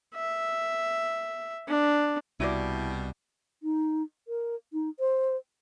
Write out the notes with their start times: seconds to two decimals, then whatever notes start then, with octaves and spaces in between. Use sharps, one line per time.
0.15 E5
1.68 D4
2.40 C2 B2 G3 E4 F#4 D5
3.63 D#4
4.28 A#4
4.73 D#4
5.00 C5